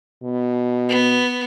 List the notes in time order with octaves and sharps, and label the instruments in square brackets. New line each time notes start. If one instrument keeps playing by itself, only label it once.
[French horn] B2
[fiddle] B3